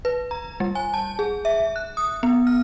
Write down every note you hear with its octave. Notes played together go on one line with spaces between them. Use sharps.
B4
A#5
G3
G#5
A5
G#4
E5
F#6
D#6
B3
F6